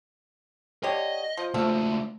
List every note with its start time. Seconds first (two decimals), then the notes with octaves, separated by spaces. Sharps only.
0.83 D3 G4 C#5 D#5
1.37 F3
1.54 C#2 F3 A3 A4